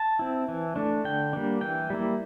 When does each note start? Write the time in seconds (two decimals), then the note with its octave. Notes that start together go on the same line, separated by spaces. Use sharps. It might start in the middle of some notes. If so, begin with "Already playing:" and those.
Already playing: A5
0.19 C4 E4
0.48 E3
0.76 A3 D4
1.04 D3 G5
1.33 G3 A#3 D4
1.61 E3 G5
1.90 G3 A#3 E4